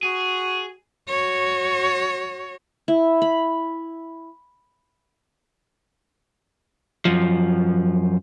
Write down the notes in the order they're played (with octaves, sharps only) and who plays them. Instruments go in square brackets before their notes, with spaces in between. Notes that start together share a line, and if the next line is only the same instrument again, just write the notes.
[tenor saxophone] F#4 [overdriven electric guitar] G#4
[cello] F#4 C#5
[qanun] E4
B5
[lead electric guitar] F#2 F3